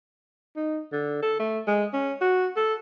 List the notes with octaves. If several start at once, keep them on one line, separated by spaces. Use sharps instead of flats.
D#4
D3
A4
A3
G#3
C#4
F#4
A4